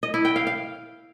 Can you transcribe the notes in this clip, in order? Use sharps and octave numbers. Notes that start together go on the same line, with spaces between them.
D#5
E4
G5
F5
F5